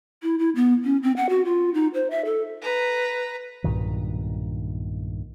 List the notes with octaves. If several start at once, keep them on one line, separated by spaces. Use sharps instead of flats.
E4
E4
B3
C#4
C4
F#5
F#4
F4
D#4
C5
E5
A4
B4 A#5
B1 G2 A#2 D#3